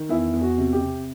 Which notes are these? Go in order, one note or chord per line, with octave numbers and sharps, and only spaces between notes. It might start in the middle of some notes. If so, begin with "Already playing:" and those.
Already playing: D#3
E2 E4
E2
F#4
C3
G4
C3